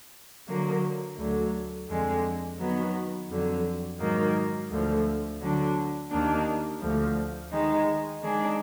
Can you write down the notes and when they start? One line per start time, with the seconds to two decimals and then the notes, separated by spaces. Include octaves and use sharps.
0.47 D3 F#3 A#3
1.17 D2 D3 F#3
1.89 F2 D3 G#3
2.59 D#3 F#3 B3
3.29 F2 D3 F#3
3.99 G#2 D#3 F#3 A#3
4.70 D2 D3 F3
5.40 D3 F#3 D4
6.10 D#2 D#3 A#3 D4
6.81 D2 D3 F3
7.51 D#3 G#3 D#4
8.22 D#3 G#3 D4 G#4